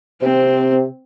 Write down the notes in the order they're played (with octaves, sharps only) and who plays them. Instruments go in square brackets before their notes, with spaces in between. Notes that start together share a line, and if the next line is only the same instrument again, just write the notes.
[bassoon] C3 [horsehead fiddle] C4